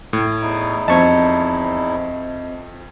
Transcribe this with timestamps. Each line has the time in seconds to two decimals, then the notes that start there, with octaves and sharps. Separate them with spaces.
0.13 A2
0.42 E2 D#4 E4
0.88 F2 C4 C5 D#5 E5 A5 C#6 G#6